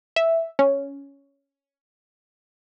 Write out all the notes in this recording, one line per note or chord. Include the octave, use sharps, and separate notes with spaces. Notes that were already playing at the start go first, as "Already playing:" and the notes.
E5
C#4